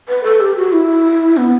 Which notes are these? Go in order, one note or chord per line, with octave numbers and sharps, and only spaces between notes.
B4
A4
G4
F#4
E4
B3